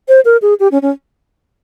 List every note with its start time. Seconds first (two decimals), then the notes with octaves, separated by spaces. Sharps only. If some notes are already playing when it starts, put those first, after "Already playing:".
0.08 C5
0.25 A#4
0.42 G#4
0.60 G4
0.72 C#4
0.82 C#4